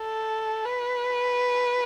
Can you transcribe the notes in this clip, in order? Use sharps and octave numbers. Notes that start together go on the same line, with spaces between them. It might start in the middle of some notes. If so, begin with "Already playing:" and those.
Already playing: A4
B4